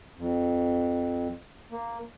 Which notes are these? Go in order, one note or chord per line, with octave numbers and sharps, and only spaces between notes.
F2
A#3